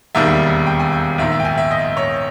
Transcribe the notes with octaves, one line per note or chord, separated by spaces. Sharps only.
E1 D#2 D#3 G3 E5
G5
G#5
G5
A#1 G#2 D#3 E5
E5
G5
G#5
E5
D#5
C#5